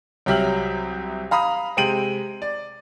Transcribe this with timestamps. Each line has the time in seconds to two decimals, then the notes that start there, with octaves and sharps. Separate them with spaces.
0.26 C2 F#3 G4 E5 F6 F#7
1.31 F5 A#5 B5 D#6
1.77 C3 G#3 G5 D7 D#7 F#7
2.42 D5